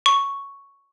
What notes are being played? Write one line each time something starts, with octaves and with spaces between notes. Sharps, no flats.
C#6